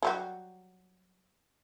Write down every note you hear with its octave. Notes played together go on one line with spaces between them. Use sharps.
F#3 G3 F#4